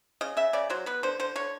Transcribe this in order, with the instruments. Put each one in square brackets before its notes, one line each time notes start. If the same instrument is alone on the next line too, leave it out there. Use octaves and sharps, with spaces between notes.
[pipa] C#3 D#5
C#3 E5
C#3 D5
F#3 C5
B3 B4
D3 C5
D3 C5
D3 C#5